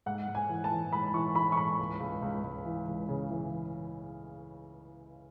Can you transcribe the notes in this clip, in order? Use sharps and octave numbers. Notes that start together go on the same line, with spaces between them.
G#2 F#5
G#2
G#5
E3
A5
E3
G#2 B5
E3 C#6
E3 B5
C#6
G#2 B5
C#2
C#2
C#2
C#2
E3
C#2
C#3
E3